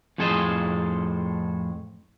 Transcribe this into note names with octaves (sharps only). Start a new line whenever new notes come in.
F2 A2 G#4 A4 C5 D#5